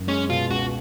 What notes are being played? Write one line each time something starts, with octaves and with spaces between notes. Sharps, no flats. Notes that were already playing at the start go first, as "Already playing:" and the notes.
Already playing: F#1
G#3 C#4
B2 F4
C#2 F#4